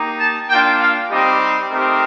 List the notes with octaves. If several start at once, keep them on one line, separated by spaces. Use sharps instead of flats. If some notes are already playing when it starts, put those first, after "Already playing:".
Already playing: A#3 D#4 G4
A5
A#3 D4 F4 G5
F5
G3 C4 D#4 G4 D#5
A3 C4 D#4 G4 A#4